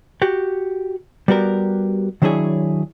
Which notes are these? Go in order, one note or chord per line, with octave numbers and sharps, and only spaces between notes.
F#4 G4
G3 B3 F#4 G4 A#4
D#3 F#3 D4 E4 G#4 C#5